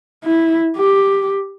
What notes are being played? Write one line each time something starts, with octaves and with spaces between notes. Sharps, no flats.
E4
G4